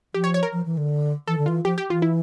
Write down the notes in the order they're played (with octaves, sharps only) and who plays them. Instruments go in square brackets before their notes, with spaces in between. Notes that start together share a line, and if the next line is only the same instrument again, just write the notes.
[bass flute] F3 [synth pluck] G4
[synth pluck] C#5
C#5
A#4
[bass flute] F3
E3
D3
[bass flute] E3 [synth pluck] A4
[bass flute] D3
[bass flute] E3 [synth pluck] F4
[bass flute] F3 [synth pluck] G4
[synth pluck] G4
[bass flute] E3 [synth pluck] F4
[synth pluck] E4